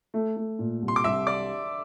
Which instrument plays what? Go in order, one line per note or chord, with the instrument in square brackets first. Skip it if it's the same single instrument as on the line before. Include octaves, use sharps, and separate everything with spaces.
[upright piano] A3
A3
A#2
C2
[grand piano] C6
D6
[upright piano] C2 [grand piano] E5 E6
[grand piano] D5 D6